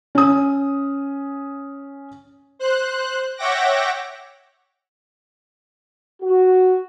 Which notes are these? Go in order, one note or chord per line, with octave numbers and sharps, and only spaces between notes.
C#4 D#6
C5 F#6
C#5 E5 F#5 G5 D6 A#6
F#4